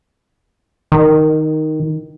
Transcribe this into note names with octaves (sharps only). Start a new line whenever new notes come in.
D#3